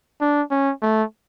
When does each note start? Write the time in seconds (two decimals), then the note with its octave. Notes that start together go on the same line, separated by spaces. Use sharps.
0.21 D4
0.51 C#4
0.82 A3